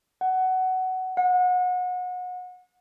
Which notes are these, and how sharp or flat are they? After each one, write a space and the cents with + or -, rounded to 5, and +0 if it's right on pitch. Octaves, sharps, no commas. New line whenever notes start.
F#5 +15
F#5 -30